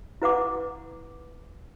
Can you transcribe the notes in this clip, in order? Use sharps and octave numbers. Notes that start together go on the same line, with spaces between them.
E4 B4 F#5 D6